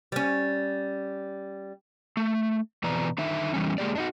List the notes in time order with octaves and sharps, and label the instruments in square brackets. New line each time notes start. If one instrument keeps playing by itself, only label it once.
[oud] G3 C#4
[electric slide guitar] A3
F2 B2 E3 B4 D5 A#5
D3 D#3 D#4 E5
E3 G3 C#4
G#3 A#3 G4 D5
D4 D#4 F#4